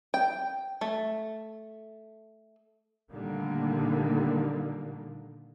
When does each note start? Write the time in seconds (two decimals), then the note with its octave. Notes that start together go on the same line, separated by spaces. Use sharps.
0.14 G5
0.81 A3
3.11 A#2 D3 D#3 G3 A3 A#3